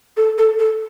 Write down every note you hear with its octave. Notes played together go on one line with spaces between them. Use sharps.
A4
A4
A4